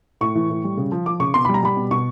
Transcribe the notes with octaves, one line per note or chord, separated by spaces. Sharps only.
A2 C#6
E3
A2
G3
C#3
F3
F3 D6
C#3 C#6
B2 C6
G3 B5
A#5
G3 B5
B2
B2 C#6